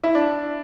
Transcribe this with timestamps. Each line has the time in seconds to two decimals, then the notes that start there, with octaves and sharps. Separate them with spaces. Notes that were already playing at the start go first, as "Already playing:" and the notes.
0.03 E4
0.15 D4